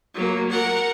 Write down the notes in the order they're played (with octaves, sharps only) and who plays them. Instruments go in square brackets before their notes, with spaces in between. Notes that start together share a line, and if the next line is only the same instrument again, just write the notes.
[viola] F#3 A#3
A#4 F#5